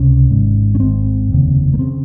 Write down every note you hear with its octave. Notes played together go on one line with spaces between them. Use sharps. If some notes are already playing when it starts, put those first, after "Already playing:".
Already playing: C#2 C3 C#4
G#1 G#2
C#4
G#1 G#2 C4
F1 D#2 C#3
A#3
C#3 C4